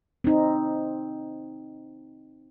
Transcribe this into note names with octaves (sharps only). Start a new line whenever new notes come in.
C4 D#4